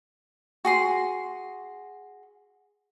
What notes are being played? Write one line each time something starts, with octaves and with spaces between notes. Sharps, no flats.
F#4 G#4 C6